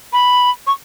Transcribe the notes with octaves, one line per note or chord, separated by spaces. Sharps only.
B5
C#6